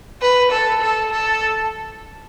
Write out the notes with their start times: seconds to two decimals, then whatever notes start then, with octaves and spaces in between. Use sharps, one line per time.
0.21 B4
0.51 A4
0.82 A4
1.11 A4